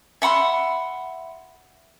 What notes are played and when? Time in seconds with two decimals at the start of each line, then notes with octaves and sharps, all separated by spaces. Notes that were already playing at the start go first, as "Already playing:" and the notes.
0.22 E5 F#5 B5 C6